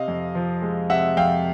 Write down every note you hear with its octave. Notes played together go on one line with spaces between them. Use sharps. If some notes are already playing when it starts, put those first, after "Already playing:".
Already playing: C3 D#5 F5
F2
F3
G#3
C3 E5 F#5
F2 F5 G5